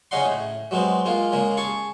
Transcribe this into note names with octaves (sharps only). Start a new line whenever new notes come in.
C#3 C#4 D#4 D#5 F#5 C6
A2
F#3 G#3 B3 C4
G#3 A#3 F4
C#3 G#3 A#3
G#4 A5 C#6